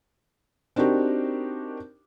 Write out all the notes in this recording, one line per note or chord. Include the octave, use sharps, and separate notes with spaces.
C4 D4 D#4 F#4 G4 A#4